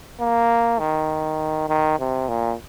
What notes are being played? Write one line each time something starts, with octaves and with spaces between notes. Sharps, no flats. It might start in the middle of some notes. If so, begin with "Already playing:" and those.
A#3
D#3
D#3
C3
A#2